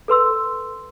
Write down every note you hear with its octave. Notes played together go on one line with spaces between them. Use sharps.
A4 B4 C6 E6